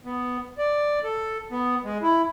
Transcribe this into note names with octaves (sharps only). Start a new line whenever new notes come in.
B3
D5
A4
B3
G#3
E4